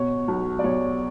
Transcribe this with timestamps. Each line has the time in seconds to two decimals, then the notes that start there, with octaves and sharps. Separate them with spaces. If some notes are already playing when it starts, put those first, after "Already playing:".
Already playing: B2 C#5
0.28 B1
0.59 D5
0.64 B1 C#5